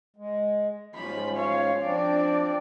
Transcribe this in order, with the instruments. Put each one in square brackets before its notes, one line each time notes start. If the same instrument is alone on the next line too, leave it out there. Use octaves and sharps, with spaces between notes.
[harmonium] G#3
[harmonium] G#2 C#4 F4 [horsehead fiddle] B5
[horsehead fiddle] C#5 F5
[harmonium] F3 C4 D4 [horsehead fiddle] D5